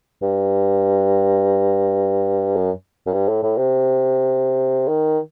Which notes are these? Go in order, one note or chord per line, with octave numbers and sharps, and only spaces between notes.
G2
F#2
F#2
G2
A2
A2
C3
D#3